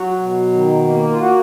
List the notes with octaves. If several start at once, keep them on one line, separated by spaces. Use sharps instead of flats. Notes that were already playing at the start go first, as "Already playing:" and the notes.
Already playing: F#3 F#4
B2
D#3
A#3
F4
A#3 F#4